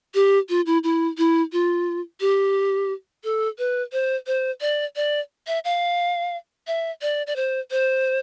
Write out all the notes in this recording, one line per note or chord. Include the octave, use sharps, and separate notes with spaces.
G4
F4
E4
E4
E4
F4
G4
A4
B4
C5
C5
D5
D5
E5
F5
E5
D5
D5
C5
C5